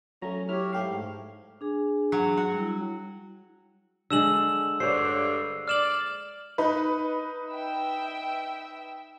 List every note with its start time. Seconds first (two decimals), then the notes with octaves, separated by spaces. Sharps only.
0.22 F#3 A3 C#4 A#5
0.49 E4 G4 C#5 F6
0.73 G#2 A3 G4 F5
1.61 D4 G#4 G#5
2.12 F#3
2.37 F#4
2.54 G3 E4
4.10 D3 G#3 E6 E7 F#7
4.80 G2 D3 C5 C#5 C7
5.68 D5 F6 E7 F#7
6.58 D#4 B4
7.52 E5 G5 E6